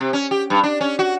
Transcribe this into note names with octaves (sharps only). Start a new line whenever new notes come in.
C3
C#4
G4
G2
D4
C#4
F#4